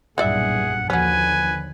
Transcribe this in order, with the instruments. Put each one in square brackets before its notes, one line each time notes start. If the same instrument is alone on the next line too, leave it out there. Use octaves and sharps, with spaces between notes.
[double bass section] B1 G2 A#2 [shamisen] E3 D5 E5 [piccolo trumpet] G#4 [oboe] F#5
[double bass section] D#2 D3 F3 [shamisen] F#3 C#4 [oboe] B4 [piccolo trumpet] G#5